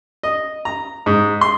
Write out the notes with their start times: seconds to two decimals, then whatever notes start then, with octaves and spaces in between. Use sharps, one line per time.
0.23 D#5
0.65 A#5
1.06 G#2
1.41 C6